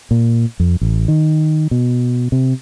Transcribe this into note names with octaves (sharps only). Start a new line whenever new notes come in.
A#2
F2
A1
D#3
B2
C3